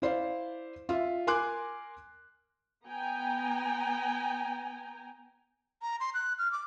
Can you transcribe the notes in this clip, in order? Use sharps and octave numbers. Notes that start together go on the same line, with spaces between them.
E4 C5 D5 F5
F4 E5
A#4 G#5 C6 D6 F#6
B3 G5 G#5 A#5
A#5
C6
F#6
F6
D6